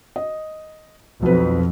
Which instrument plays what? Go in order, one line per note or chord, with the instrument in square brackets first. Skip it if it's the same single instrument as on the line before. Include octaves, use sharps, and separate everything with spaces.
[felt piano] D#5
[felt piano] B1 B4 [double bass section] F2